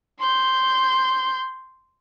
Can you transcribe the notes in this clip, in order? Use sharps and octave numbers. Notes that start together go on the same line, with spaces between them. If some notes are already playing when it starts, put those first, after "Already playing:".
C6 G6